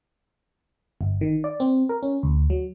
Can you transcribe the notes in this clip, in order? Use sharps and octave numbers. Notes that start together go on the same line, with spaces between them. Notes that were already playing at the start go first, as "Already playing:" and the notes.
G1
D#3
D5
C4
A#4
C#4
D2
F#3